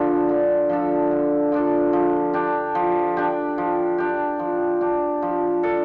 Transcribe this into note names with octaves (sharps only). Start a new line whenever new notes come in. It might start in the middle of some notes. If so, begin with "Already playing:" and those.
Already playing: D3 F3 D4 A4
D3
F3 D4 A4
D3
F3 D4 A4
F3
D4 G4
F3
D4 G4
F3
D4 G4
F3
D4 G4
F3
D4 A4